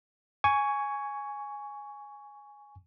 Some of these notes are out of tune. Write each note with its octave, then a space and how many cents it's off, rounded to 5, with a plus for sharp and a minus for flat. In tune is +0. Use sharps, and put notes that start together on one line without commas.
G#5 +0 C#6 +15